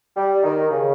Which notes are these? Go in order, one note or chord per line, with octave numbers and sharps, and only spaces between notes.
G3
D#3
C#3